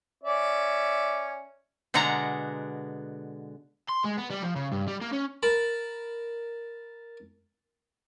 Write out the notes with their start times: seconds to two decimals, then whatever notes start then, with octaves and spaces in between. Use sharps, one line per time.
0.23 C#4 D5 E5
1.94 B2 D3 G#3 F#5 A#5
3.89 C6
4.04 G#3
4.17 B3
4.30 G3
4.43 F3
4.56 C#3
4.72 G2
4.88 G3
5.02 A#3
5.13 C#4
5.43 A#4 A5 B5